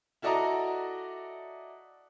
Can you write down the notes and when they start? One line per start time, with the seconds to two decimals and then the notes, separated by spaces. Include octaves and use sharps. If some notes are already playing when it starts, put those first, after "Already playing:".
0.22 E4 F#4 A4 D5 D#5 A#5